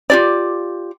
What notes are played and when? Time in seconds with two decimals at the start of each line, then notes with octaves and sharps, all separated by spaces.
0.10 F4 G4 D5